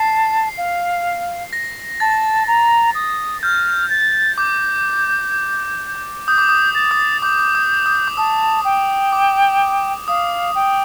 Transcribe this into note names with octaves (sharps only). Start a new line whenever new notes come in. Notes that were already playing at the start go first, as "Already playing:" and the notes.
Already playing: A5 C7
F5
A#6
A5 A6
A#5
D#6
F6 G6
A6
D6 G6
D#6 G6
D6
D#6
A6
D#6
D6 G6
D6
D#6
D#6
D6
A5 D#6
G5
D6
F5 D#6
G5